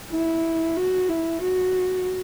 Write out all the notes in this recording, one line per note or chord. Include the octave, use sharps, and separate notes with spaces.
E4
F#4
E4
F#4